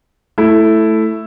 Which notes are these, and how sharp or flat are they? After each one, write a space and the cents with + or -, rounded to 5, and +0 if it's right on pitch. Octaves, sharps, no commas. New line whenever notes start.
A3 +0 E4 +0